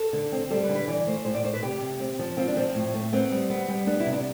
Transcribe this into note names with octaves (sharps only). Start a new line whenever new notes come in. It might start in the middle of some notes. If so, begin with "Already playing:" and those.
Already playing: A4
D3
C4
G3 A4
B4
D3
B4
E3 D5
A3 C5
A2 C5
D5
A3 C5
B4
C3 G4
C3
C4
F3
C4 F4
D4
F3 C4
A2
A3
B3 C4
G3
B3
G3
B3 D4
E4
C3
D4